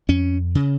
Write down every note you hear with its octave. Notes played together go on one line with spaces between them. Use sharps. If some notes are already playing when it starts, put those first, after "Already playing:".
F2 C#4
C#3